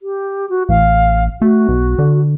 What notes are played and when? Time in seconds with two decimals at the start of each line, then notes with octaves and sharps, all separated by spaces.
0.01 G4
0.50 F#4
0.69 A1 F5
1.42 A3 F#4
1.68 B1
1.99 D3